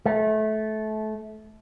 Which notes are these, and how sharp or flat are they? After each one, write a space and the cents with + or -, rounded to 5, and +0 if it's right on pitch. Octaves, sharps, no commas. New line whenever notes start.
A3 -25